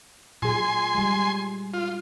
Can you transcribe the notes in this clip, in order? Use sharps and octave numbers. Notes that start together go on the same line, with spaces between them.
A#2 F#3 G#4 G#5 C6
G3 G#3
F4